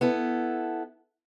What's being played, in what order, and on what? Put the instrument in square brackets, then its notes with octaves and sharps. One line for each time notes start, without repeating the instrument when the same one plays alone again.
[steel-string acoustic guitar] B3 E4 A4